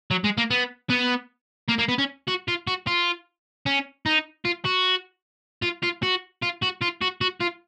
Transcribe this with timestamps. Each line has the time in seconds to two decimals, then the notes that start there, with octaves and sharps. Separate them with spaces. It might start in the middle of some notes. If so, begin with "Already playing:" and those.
0.11 F#3
0.24 G#3
0.38 A#3
0.51 B3
0.90 B3
1.68 A#3
1.79 A#3
1.89 B3
1.99 C#4
2.28 F#4
2.48 F4
2.67 F#4
2.87 F4
3.66 C#4
4.06 D#4
4.45 F4
4.65 F#4
5.63 F4
5.83 F4
6.03 F#4
6.42 F4
6.62 F#4
6.81 F4
7.01 F#4
7.21 F#4
7.41 F4